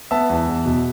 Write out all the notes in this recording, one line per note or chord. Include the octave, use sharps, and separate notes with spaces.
B3 E5 A5
E2
E2
B2